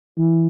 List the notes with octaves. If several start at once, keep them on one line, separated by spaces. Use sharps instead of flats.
E3